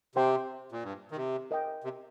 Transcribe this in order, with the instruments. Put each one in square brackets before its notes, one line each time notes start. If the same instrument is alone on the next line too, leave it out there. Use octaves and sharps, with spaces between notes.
[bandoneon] C3 [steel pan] C5 G5 C6
[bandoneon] A#2
G2
D#3
C3
[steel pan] A#4 D#5 G5
[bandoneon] C3